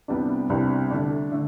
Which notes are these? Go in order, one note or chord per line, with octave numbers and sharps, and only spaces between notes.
C2 C3 G3 B3 D4
C2 C3 G3 B3 D4
D3 A3 D4
D3 A3